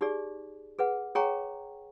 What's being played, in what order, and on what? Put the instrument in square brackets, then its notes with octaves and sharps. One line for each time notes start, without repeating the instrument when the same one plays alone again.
[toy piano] D#4 G4 G#4 D5
G#4 B4 F#5
G#4 C#5 F#5 G5 A#5 C#6